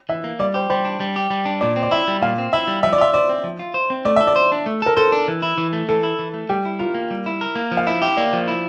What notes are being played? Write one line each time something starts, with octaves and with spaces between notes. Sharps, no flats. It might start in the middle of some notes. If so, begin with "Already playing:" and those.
E3 E5
A#3
G3 D5
G4 C5
G3 C5
D4
G3
G4
G3
D4
A#2 D5
C4
D5
E4 E5
G3
A#2 F5
C4
E4 E5
G3
F3 E5
D5
F4 E5
C5 D5
C4
F3
F4
C5
C4
A3 D5
A4 E5
D5
C5
D4
A3
A4 A#4
A4 C5
D4
E3
E4
E3
A3
E3 A4
E4
E3
A3
G3 G4
E4
F4 A#4
A#3
G3
E4
A#4
A#3
F3
F5
E4 E5
G4 E5
A#3 D5
F3
E4